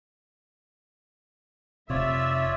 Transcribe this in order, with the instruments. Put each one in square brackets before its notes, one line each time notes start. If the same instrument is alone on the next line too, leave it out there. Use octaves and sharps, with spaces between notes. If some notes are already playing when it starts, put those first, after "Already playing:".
[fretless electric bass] F1 C3 [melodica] F4 C#5 D5 [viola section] E5